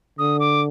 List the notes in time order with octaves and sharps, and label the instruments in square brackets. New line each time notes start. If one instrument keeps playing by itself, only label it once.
[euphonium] D3 [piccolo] D#6
[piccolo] D6